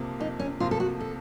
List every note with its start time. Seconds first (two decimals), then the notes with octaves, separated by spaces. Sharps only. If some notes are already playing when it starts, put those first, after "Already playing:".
Already playing: F2 C3 F3 A#3
0.20 F2 D#4
0.40 C#4
0.60 C3 F3 A#3 F4
0.71 A4
0.80 F#4
1.00 A4